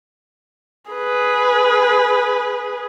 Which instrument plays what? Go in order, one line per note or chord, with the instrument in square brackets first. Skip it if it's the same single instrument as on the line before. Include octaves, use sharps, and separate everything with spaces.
[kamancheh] G#4 B4